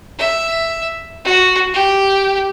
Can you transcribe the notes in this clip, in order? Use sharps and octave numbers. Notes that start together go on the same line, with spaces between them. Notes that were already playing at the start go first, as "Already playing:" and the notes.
E5
F#4
G4